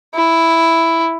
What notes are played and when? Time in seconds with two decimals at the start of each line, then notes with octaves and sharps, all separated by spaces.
0.15 E4